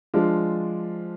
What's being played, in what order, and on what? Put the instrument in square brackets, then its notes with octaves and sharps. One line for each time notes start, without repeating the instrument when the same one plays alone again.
[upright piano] F3 G#3 D4 F4